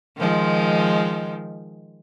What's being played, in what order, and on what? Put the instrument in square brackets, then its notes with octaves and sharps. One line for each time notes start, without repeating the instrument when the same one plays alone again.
[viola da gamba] D#3 F3 G#3